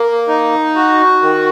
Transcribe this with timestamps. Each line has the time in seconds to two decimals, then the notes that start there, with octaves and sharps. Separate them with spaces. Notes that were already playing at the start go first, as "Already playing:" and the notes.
Already playing: A#3
0.28 D#4
0.76 F#4
1.22 D#3